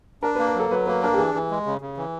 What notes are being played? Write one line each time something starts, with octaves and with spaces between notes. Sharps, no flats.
D4 A#4
B4
A#3
A#4
F#3 A4
F#3 B4
A#3 B4
D4 A#4
G4
E3 G#4
E3
G#3
C#3
C#3
E3